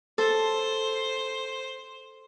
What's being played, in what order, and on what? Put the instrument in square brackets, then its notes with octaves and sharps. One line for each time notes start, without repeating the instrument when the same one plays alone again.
[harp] A4 [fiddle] C5